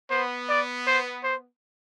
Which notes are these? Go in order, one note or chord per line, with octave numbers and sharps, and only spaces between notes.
B3 C5
D5
C5
C5